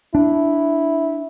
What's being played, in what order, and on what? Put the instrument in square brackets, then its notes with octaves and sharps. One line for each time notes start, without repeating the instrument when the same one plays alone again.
[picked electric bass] D4 [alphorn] E4